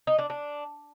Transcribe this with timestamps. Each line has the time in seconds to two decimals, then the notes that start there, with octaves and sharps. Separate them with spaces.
0.07 D#4
0.19 D4
0.30 D4